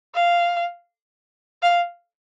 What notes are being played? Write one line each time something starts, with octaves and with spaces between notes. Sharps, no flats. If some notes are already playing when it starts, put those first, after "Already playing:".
F5
F5